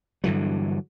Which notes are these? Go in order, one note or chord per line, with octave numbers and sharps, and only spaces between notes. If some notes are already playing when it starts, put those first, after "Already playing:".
G2 D3 E3 F#3